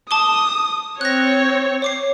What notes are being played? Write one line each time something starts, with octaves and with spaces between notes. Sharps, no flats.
A5 D6 D#6 G7
C4 C#5 F#6 A#6
C#5 D6 C7